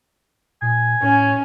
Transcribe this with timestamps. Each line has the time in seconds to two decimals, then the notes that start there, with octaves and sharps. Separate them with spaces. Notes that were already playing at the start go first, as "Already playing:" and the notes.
0.62 A#2 G#5
1.02 A2 C#4